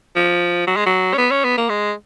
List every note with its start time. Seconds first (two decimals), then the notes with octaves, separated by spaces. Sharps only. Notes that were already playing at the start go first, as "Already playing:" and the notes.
0.16 F3
0.67 F#3
0.76 G#3
0.86 F#3
1.14 C#4
1.18 B3
1.31 C#4
1.45 B3
1.57 A#3
1.69 G#3